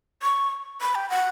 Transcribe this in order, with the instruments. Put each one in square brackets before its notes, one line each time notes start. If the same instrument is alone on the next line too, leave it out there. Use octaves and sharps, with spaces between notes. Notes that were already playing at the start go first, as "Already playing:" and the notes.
[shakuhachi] C#6
B5
G5
F#5